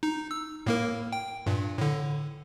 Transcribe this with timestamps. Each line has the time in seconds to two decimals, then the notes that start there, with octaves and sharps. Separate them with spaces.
0.03 D#4
0.31 E6
0.66 A2 A#3 A#4
1.12 G5
1.46 G2 A#2
1.78 A2 D3